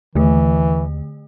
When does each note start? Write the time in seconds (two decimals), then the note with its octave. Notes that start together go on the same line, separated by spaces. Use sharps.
0.15 D#2 D3 E3 A3